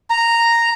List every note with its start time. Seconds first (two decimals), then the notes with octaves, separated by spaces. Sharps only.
0.10 A#5